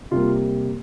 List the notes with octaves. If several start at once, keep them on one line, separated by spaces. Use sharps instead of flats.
C3 G3 A#3 F4